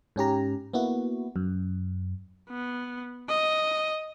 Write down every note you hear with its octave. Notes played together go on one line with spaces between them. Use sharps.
G#2 C#4 G4 A#5
A#3 B3 E4 F#4
F#2
B3
D#5